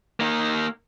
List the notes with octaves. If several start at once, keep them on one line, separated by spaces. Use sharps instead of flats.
A#3 D#4